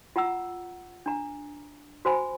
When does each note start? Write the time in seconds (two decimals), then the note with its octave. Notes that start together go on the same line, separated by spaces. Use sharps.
0.16 F4 F#5 A#5 E6
1.06 D4 A#5
2.05 F#4 C5 G#5 B5